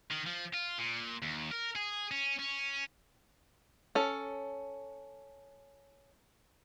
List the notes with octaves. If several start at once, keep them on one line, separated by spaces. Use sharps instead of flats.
D#3
F3
F4
A#2
D#2
A#4
G#4
C#4
C#4
C#4 A4